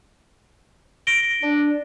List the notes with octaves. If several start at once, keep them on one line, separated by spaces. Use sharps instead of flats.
A#6 D7 G7
D4